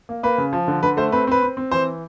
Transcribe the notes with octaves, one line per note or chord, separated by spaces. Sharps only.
A#3
A#3 B4
C#3
F3
D3
D3 B4
A3 C5
C4 B4
C4 B4
C4
C4
E3 C5